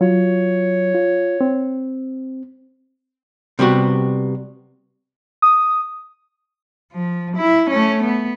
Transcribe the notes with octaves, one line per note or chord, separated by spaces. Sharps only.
F#3 F4 C#5
F4
C4
C3 G3 B3 F#4
D#6
F3
E4
A3 C#4
B3